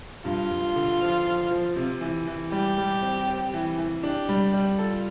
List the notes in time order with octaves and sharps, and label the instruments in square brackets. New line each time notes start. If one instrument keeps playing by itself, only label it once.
[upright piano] G2 [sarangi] F4
[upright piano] G2
D3
F3
F3
F3
C3
E3
E3
[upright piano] G3 [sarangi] G4
[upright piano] G3
C4
C4
E3
E3
[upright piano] D4 [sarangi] G4
[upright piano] G3
G3
[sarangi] F4 [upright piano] A4